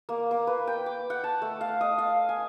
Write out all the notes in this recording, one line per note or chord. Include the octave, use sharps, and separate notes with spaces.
A#3
A#3
B4
G5
D6
F#5
A5
A3
F5
D#5
F5
G#5